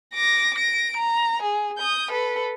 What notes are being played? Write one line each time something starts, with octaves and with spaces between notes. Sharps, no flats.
D6 A#6
A#6 D7
A#5
G#4
D#6 G6
A4 B4